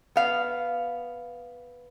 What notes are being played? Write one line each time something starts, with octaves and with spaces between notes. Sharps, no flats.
B3 F5